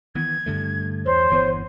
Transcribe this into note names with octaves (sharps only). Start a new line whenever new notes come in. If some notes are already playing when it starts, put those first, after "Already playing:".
D#3 E3 B3 G#6
G2 D3 A3
E2 C5 C#5
G1 E3 B3